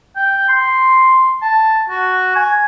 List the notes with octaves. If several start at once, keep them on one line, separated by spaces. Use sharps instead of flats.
G5
C6
A5
F#4
G#5